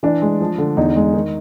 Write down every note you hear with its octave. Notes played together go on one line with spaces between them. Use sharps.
E3 D4
G#3
F3
D3
E2 D#4
G#3
D#3